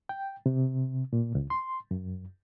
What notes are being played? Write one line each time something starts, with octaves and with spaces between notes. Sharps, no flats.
G5
C3
A#2
C#2
C6
F#2